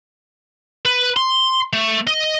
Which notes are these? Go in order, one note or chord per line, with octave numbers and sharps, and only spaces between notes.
B4
C6
A3
D#5